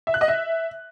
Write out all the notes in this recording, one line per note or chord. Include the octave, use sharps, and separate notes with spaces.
E5
F#6
D#5
E5